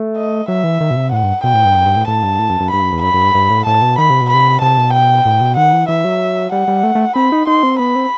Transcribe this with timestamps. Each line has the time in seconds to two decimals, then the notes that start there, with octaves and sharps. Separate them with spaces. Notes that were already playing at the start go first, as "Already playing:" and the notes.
Already playing: A3
0.17 D#5
0.48 F#3 E5
0.64 E3
0.81 D#3
0.91 B2
0.96 C3
1.12 A2 F#5
1.23 G2
1.44 B2 G5
1.54 A2
1.65 G2
1.76 F#2
1.86 G2
1.96 A2
2.07 A2 A5
2.23 G2
2.39 A2
2.50 F#2
2.60 F#2
2.71 G2 B5
2.81 F#2
2.93 E2
3.02 F#2 B5
3.14 F#2
3.24 G2
3.34 G2
3.50 A2
3.66 A2 A5
3.82 B2
3.98 D#3 B5
4.10 C3
4.22 B2
4.30 C3 B5
4.61 C3 A5
4.78 B2
4.93 G5
5.25 A2
5.41 B2
5.57 D#3 F#5
5.73 E3
5.88 E3 E5
6.05 F#3
6.52 G3 F#5
6.68 G3
6.83 A3
6.95 A3
7.16 C4 B5
7.32 D#4
7.47 D#4 C6
7.63 C4
7.79 B3 B5
7.95 C4